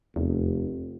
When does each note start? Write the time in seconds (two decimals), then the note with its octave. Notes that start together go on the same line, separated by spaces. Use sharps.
0.16 F1 E2